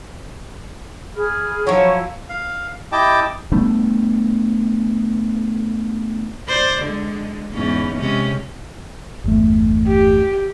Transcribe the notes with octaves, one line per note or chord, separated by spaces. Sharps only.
G#4 B5 F6
F3 F#3 E4 C#5 B5
F5
E4 G4 D#5 G5 A5 D6
G3 A3 B3 D4
C5 D5
D3 G#3
E2 G#2 C#4
C3 G#3 C#4
G1 E2 A3
G4